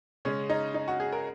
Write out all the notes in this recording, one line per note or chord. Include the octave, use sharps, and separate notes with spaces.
C#3 G#3 C#4
D#4
D#4
F#4
G#4
A#4